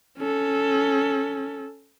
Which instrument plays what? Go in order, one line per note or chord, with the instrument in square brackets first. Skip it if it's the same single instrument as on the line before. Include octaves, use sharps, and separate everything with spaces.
[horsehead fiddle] C#4 A4